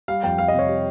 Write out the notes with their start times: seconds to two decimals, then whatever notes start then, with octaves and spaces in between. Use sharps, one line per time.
0.08 G3 F5
0.23 F2 G5
0.38 F2 F5
0.48 D#5
0.54 C3
0.59 C#5
0.69 G3